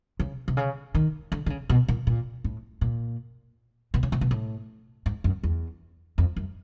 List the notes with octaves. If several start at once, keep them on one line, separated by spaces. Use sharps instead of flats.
C#3
C3
C#3
D#3
D3
D3
C#3
B2
A#2
A#2
A2
A#2
B2
C#3
C3
B2
A2
G#2
F#2
E2
F2
F#2